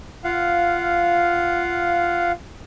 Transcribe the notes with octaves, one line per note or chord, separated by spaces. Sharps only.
F4 F5 F#5